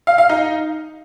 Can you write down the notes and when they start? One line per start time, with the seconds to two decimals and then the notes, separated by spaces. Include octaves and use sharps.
0.07 F5
0.18 F5
0.29 D#4